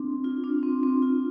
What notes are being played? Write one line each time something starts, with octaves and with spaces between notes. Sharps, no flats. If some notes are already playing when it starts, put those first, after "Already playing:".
Already playing: C4 D4
F4
D4
C4
C4
F4